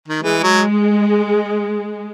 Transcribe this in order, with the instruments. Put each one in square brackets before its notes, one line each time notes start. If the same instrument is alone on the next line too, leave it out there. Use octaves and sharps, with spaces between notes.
[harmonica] D#3
[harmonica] E3 [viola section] G#3
[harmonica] F#3